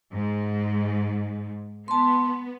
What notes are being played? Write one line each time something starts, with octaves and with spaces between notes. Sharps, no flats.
G#2
B3 A5 C6